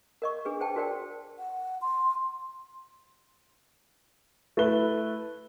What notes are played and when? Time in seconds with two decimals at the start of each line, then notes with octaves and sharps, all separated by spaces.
0.22 A#4 D#5 C#6
0.45 D4 G#4 B4
0.60 G#4 C5 G5 A5
0.76 F#4 A#4 C5 D5 G5
1.38 F#5
1.82 C6
4.57 A3 E4 B4 G7